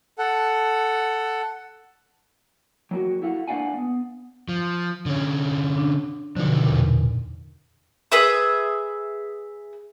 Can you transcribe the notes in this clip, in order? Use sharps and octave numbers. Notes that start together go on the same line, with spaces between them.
A4 F#5
F#3 A#3 F#4
E4 A4 F5 F#5
A#3 D4 D5 F5 F#5 G#5
B3
F3
D3 C#4
D4
B2 D3 F3 F#3 D#4
E2 A#2
G#4 B4 E5 D#6